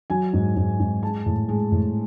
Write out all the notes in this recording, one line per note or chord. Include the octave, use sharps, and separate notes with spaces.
F#3 G#5
G#2
G#2
G#2
G#3 A5
A2
G#3
A2